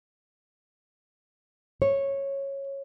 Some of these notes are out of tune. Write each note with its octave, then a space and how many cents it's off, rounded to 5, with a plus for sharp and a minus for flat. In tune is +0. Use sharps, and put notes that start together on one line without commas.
C#5 -10